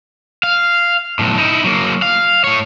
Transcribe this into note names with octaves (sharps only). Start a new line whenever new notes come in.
F5
B1 A2
D#4 E4
F#3 A#3
F5
A2 C#5